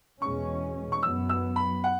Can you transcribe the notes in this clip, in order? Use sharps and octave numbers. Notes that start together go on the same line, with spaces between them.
E2 B2 G#3 C#4 C#6
C#6
F#2 F#3 B3 E6
E6
B5
F#5